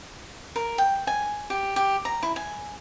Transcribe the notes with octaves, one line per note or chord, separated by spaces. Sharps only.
A#4
G5
G#5
G4
G4
A#5
E4
G#5